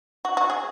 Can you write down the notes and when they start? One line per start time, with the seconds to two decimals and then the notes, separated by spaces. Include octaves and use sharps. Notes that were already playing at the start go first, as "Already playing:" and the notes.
0.25 F#4
0.37 F#4
0.50 G#4